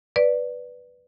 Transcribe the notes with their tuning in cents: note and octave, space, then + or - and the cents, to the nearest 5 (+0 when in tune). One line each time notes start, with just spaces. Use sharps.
B4 +0 D5 +0